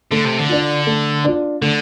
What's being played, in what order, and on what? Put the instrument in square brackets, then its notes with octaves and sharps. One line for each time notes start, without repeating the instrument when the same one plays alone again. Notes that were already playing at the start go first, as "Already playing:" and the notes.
[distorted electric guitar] D3 [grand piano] A3
[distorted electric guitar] C3
D3
[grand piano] D4 F4
A3
D4 F4
[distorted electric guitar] D3 [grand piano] A3